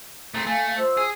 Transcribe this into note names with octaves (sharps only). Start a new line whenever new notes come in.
A3 C4 G#4 A#5
A3 F5 G#5
F4 C5 E6
G#4